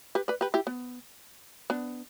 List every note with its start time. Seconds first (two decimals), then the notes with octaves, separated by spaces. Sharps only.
0.15 G4 B4
0.28 B4 D5
0.41 G4 B4
0.54 E4 G4
0.67 B3
1.70 B3 D4